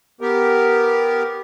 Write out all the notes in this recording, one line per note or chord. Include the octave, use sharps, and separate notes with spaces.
B3 G4 A#4